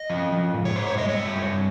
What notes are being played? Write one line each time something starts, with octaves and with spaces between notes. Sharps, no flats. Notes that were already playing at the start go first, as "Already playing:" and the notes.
Already playing: D#5
F3
F3
G#2
C#5
G#2 C5
C#5
G#3 D#5
C#5
G2
G2